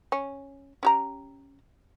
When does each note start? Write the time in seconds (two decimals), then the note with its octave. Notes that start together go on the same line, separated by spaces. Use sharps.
0.12 C#4
0.83 C#4 G4 A#5